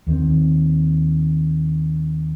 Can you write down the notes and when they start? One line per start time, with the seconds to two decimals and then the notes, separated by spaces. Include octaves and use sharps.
0.07 D#2 D#3 C4